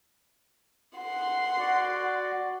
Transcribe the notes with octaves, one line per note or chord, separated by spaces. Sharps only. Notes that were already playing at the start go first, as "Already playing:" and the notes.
F#5 C6
F#4 D5